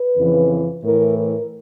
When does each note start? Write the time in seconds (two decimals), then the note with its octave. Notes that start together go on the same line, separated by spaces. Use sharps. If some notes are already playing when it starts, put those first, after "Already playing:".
Already playing: B4
0.16 F2 C#3 E3
0.82 A2 E3 A#4
1.15 A#4